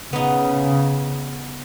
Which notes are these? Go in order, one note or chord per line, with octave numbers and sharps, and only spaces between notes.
C#3 B3 D#4